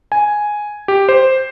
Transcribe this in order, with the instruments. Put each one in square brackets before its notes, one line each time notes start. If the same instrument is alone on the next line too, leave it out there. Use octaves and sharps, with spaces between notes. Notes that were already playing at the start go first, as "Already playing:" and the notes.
[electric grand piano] G#5
G4
C5